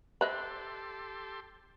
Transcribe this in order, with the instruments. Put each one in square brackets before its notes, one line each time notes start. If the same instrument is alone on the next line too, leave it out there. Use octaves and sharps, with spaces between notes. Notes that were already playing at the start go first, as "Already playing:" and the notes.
[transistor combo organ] G4 A4 C6 [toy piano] C5 [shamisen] D#5 E5 B5